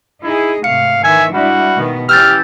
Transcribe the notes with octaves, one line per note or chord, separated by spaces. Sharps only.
D#4 E4 G#4
G#2 C3 A3 F5 C#7
D#3 E3 E5 G#5
G3 G#3 D4 E4 F#4
B2 D#3 B3
E3 C#4 G4 E6 F6 G6 A6